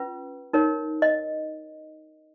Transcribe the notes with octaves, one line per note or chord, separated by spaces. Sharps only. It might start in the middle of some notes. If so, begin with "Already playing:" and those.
Already playing: C#4 F4 B4
D#4 A#4 C#5
D#5